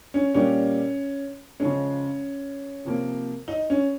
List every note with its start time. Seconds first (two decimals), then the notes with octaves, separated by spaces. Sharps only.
0.14 C#4
0.34 A#2 G3 A#3 C#4
1.60 C#3 F3 G#3 C#4
2.85 C3 F3 A#3
3.48 D#4
3.70 C#4